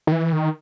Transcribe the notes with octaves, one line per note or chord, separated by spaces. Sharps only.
D#3
E3
D#3